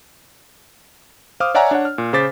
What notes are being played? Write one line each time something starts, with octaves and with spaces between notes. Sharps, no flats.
C5 F5 D6 D#6 F6
C#5 D5 E5 F#5 G#5 A#5
D4 C#5 F#5
F6
A#2
C#3 C5 D6 A6 B6